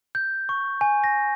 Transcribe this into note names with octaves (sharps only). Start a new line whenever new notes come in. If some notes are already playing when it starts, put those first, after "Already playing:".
G6
C#6
G#5
A#6